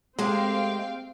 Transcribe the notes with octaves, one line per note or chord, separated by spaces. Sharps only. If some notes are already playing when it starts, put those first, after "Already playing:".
G#3 A3 C4 G4 F5 G5